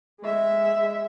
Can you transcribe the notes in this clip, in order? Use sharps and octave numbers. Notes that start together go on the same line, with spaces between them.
G#3 E5